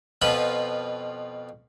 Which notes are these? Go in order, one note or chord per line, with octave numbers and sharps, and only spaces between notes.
F2 B2 F3 B4 B5